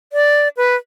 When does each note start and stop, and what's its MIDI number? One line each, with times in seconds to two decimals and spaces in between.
0.13 0.48 74
0.57 0.75 71